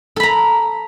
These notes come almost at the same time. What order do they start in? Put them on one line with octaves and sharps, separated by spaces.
A4 B5 A#5